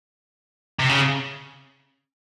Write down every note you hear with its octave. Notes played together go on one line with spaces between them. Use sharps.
C3
C#3